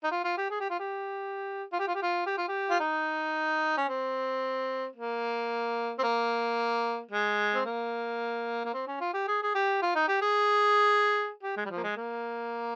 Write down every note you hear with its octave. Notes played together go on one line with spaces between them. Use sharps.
D#4
F4
F4
G4
G#4
G4
F4
G4
F4
G4
F4
G4
F4
G4
F4
G4
F4
D#4
C#4
C4
A#3
C4
A#3
G#3
C4
A#3
A#3
C4
C#4
F4
G4
G#4
G#4
G4
F4
D#4
G4
G#4
G4
G#3
G3
F3
A#3
G#3
A#3